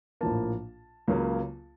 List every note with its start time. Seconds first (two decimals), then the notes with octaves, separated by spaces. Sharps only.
0.21 A#1 A2 F3 A#3 A5
1.08 C#2 C#3 F#3 A#3